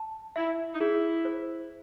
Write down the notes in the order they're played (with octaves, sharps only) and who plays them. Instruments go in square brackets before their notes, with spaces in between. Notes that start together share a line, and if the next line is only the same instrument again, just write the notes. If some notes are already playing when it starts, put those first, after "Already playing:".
Already playing: [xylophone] A5
[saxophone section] E4 [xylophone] E5
[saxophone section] D#4
[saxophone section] E4 [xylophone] G#4
[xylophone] C5